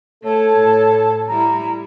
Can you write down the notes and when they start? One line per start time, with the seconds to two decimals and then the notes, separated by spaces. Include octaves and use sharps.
0.24 A3 A4 C#5 A5
0.58 A2
1.28 G3 E4 A#5